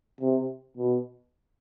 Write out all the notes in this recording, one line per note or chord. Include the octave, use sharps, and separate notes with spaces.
C3
B2